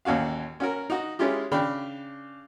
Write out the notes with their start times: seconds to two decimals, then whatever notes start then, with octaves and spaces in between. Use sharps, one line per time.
0.05 A1 D#2 C#4 F#4 F5
0.60 C#4 F#4 A#4
0.90 D#4 F#4
1.19 G#3 C#4 E4 F4 G4
1.52 C#3 D4 G5 B5